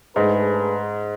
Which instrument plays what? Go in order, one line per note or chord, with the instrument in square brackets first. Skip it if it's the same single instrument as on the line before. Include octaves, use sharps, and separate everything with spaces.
[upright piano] G#2 [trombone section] A3 D4 G#4 B4